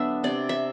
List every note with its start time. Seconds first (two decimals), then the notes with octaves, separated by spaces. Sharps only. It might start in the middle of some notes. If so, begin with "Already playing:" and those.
Already playing: D3 F#3 B3 D4 E5
0.24 C3 D5
0.49 E5